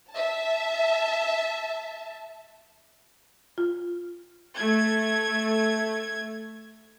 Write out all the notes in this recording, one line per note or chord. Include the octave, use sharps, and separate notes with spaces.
E5 A5
F4
A3 G#6